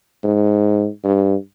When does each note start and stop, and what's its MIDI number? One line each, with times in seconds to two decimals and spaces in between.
0.24 0.87 44
1.04 1.36 43